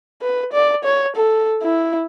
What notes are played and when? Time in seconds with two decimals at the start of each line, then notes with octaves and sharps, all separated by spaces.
0.22 B4
0.53 D5
0.84 C#5
1.16 A4
1.62 E4